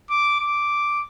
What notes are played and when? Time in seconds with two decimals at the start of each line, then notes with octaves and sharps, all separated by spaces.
0.10 D6
0.40 D6